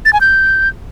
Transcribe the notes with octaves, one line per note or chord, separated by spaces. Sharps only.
A6
G#5
G6